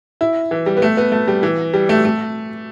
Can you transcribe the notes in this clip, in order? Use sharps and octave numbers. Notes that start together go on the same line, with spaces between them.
E4
E3
G3
B3
A3
B3
A3
G3
E3
G3
A3
A3